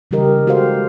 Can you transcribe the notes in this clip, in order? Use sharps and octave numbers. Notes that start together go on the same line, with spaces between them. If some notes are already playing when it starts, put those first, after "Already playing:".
C#3 E3 G3 G4 A#4 D#5
G#3 F#4 G4 A4 C5 F5